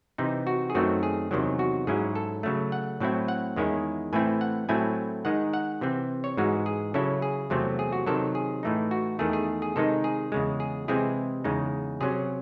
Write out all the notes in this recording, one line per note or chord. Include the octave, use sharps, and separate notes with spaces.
C3 E3 C4 D#4
F#4
G#4
F#2 D#3 F#3 A3 C4 F#4
G#4
E2 C3 D#3 F#3
F#4
G#2 F#3 C#4 E4 G#4
A4
C#3 F#3 A3
F#5
A2 F#3 C4 E4
F#5
E2 D#3 G#3 C#4 E4
A2 E3 A3 C4 E4 G#5
F#5
A2 F#3 A3 C4 E4 G#5
D#3 G#3 D#4 F#5
F#5
C3 E3 C4
C#5
G#2 E3 G#3 F#4
G#4
C#3 F#3 C#4 E4 A4
G#4
E2 C3 F#3 A3 C4
G#4
F#4
C3 D#3 F#3 A4
G#4
A2 E3 A3 D#4
F#4
E2 D#3 A3 G#4
G#4
G#4
C3 D#3 G#3 D#4 A4
G#4
E2 C#3 G#3
G#4
C3 E3 G#3 C4 E4 G#4
E2 C#3 G#3 D#4
C3 F#3 C#4 G#4